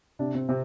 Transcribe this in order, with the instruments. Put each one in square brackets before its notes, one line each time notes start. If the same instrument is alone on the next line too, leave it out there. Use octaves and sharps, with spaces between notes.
[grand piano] C3 [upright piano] D4
[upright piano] C4
[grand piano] C3 [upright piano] C4